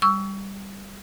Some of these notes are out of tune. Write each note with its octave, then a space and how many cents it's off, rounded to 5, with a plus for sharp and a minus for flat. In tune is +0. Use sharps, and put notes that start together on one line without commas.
G3 +5 C#6 +25 E6 +0